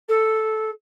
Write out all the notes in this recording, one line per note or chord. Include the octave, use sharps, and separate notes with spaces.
A4